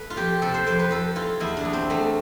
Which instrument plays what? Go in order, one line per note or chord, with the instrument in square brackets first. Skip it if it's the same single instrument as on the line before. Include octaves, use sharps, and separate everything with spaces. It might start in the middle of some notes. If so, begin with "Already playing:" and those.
Already playing: [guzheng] A4 B4
F4
F2 G4
C3 A4
C5
F2 C5
B4
F2 A4
E3 F4
E2 E4
D4
E2
C4
E2 A3